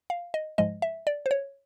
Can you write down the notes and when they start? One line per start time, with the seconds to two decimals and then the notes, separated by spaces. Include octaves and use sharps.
0.10 F5
0.34 D#5
0.58 G#2 F3 G#3 D#5
0.82 E5
1.07 D5
1.26 C5
1.31 C#5